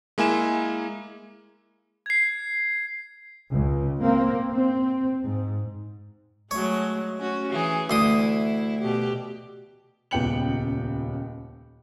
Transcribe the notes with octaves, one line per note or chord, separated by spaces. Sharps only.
G#3 A#3 E4 G#5 E7
G#6 C7
C#2
A#3 C4
C4
G#2
F#3 G#3 A3 C#5
C#4 F#4
E3 G#4
D2 E4 C6 D#6
B2 G4
D#1 C#2 B3 G5 C#7 F#7